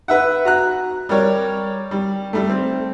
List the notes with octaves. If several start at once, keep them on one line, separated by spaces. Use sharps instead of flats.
B4 E5 F#5
F#4 A#5 F#6
G3 A#4 C#5 D5
G3
G3 A3
C4